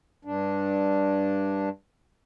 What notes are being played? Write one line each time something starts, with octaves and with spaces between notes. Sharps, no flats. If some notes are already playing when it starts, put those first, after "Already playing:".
G2 D4